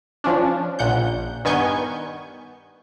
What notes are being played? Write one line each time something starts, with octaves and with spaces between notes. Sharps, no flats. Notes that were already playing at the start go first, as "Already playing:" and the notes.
F3 C#4 D4
A#1 A#2 F#5 G6
G2 D#3 B3 G#5 C#6 G6